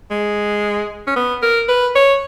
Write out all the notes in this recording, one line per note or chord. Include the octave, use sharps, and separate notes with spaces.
G#3
C#4
B3
A#4
B4
C#5